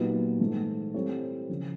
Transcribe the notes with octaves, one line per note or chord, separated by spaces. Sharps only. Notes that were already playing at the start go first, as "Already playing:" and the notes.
Already playing: A#2 F#3 B3 D#4 G4
G#2 E3 A3
G3 C4 E4 A4 C#5
C#3 F3